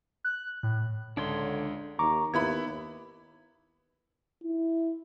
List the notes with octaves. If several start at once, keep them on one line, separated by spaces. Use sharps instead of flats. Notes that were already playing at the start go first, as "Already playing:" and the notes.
F#6
A2
C#2 D3 D4 C#5 C6
D#2 A#5 C#6 D6
D#2 B3 E4 B5 G#6
E4